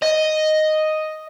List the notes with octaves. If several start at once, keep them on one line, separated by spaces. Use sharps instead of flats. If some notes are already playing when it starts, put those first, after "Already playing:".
D#5